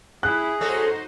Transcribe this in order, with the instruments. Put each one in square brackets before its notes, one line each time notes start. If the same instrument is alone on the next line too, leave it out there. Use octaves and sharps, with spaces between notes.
[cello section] E4 [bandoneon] G#4 [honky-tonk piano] F#6
[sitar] A3 C#4 A4 [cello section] D#4 F#4 C5